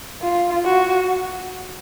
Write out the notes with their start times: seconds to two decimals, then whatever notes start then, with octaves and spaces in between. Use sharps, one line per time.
0.22 F4
0.65 F#4